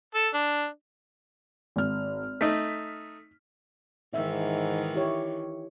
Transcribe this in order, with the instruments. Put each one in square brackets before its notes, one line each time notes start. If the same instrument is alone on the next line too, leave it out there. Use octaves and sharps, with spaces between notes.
[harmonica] A4
D4
[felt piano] G#1 F6
[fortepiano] A3 D#4 [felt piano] B6
[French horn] G#2 [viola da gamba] D#3 E3 [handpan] E5
[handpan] E4 G4 C#5